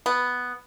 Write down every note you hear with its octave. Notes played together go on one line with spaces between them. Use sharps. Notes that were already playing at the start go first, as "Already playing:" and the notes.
B3